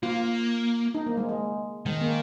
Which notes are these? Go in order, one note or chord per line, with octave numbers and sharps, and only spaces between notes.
A#3 F4
D#4
A#3
G#3
G#3
D#3 G#3
A#3